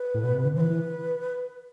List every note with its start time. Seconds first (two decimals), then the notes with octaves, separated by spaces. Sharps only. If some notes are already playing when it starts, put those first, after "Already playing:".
Already playing: B4
0.14 A2
0.24 B2
0.34 C3
0.45 D3
0.56 E3 B4 C5
0.70 E3